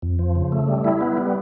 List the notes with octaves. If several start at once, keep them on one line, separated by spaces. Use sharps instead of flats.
F2
F3
C#3
A3
G3
E4
B3
G3